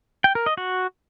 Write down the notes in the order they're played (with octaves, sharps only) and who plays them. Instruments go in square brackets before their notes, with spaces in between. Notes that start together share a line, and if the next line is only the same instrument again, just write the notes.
[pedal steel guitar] G5
A#4
D#5
F#4